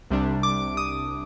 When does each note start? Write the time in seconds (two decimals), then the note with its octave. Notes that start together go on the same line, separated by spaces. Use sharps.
0.11 C2 C3 G3 D4
0.43 D6
0.77 D#6